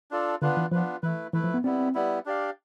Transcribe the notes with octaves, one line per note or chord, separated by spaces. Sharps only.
D4 F4 A4 D5
D3 B3 D4 F4 B4
E3
F3 B3 D4 F4 B4
E3 A3 E4 B4
E3 A3 E4 B4
F3
B3
G3 B3 C4 E4
G3 B3 E4
D4 G4 D5 F5